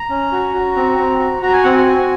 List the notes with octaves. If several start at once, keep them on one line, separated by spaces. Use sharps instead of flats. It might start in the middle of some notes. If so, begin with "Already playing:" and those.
Already playing: A#5
C#4
F#4
F#4
C4
C4
F#4
F#4 A#5
G#5
C4 F#5
G#5
F#4